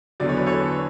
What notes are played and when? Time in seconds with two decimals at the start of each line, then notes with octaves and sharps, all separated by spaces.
0.20 E2 D3 F#3 D5
0.29 C#5
0.37 B4
0.46 A4 C#5